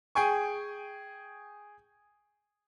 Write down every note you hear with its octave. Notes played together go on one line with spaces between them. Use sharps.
G#4 G5 G#5 C#6